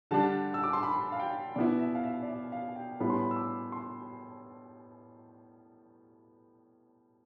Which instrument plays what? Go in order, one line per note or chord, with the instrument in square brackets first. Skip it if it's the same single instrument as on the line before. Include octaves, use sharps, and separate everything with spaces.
[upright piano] D3 G3 D4 A5
E6
D6
C6
B5
F5
G5
B2 B3 E4 D5
E5
F5
E5
D5
E5
F5
G5
A2 G3 B3 E4 B5
C6
B5
E6
D6
C6